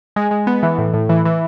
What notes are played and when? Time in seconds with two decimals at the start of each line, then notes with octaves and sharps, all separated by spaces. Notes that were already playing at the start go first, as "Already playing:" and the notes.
0.16 G#3
0.31 G#3
0.47 B3
0.63 E3
0.78 A2
0.94 A2
1.09 E3
1.25 E3